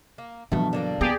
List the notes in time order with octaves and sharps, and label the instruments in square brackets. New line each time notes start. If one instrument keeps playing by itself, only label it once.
[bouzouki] A#3
[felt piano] E2 G2 B2 [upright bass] F3 F#3 [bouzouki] A3
[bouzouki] D3 A#3 D4
[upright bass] D#2 B3 [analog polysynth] G4 G#4 D5